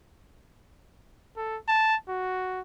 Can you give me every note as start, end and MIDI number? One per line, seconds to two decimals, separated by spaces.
1.36 1.57 69
1.68 1.95 81
2.08 2.60 66